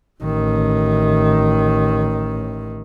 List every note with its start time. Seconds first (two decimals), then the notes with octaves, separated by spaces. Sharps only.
0.22 A1 D#3